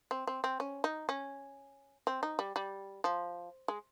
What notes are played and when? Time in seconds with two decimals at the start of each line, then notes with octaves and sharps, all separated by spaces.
0.11 C4
0.27 C4
0.44 C4
0.60 C#4
0.84 D#4
1.09 C#4
2.07 C4
2.23 D#4
2.39 G3
2.56 G3
3.04 F3
3.68 G#3